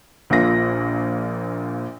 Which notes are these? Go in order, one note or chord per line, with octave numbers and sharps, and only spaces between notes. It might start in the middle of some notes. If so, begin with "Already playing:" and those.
A#1 A#2 F4 A#6